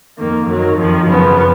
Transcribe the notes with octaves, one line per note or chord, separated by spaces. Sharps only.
F2 D#3 A#3
F#2 D#3 F#3
F2 D#3 F3
F#2 C#3 F3 B3